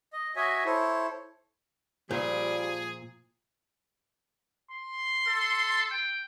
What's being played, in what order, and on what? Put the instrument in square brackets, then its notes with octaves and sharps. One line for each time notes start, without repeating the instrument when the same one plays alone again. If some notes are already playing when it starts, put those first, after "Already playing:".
[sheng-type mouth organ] D#5
F#4 C#5 D#5 E5 G#5
E4 A4 C5 C#5
[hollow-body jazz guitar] A#2 [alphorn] F3 [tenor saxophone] G3 [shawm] G#4
[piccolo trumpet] C6
[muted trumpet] A4
G5